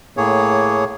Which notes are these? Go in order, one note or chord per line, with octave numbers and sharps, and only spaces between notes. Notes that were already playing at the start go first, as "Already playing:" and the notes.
A2 A#3 G#4 C#5